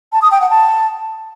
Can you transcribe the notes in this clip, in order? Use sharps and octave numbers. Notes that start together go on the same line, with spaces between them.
A5
D#6
G5
F#5
A5